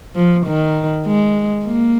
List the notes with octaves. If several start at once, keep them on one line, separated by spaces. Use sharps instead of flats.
F3
D#3
G#3
A#3